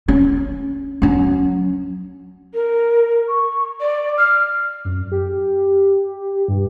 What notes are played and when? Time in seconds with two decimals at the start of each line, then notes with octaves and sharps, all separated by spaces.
0.08 C#4
1.02 F#3 C#4
2.54 A#4
3.29 C#6
3.81 D5
4.18 F6
4.85 F#2
5.12 G4
6.48 G2